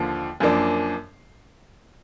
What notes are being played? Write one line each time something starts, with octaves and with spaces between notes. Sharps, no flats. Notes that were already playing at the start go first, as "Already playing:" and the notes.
Already playing: D#2 D3 F3
F#2 F3 A#3 D4